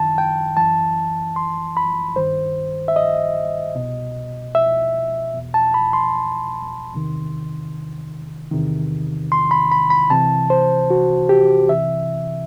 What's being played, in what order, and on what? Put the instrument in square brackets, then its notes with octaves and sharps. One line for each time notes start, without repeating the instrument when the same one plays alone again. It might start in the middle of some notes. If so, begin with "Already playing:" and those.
Already playing: [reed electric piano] F#2 D#3 A5
G5
F#2 E3 A5
C6
B5
G2 D#3 C5
E5
D#5
C2 B2
E5
E2 B2
A5
B5
C6
E2 C3 D#3
E2 C3 D#3
C6
B5
B5
B5
C2 C3 E3 A5
C5
F#4
G4
C2 C3 E3 E5